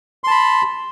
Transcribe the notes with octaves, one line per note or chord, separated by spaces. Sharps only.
A5 B5 C6